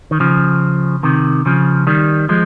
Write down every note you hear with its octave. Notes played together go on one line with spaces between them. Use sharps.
D#3
C#3 F3
C3 D#3
C#3 F3
D#3 G3
F3 G#3